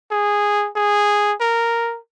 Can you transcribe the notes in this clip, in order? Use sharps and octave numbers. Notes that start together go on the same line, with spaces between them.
G#4
G#4
A#4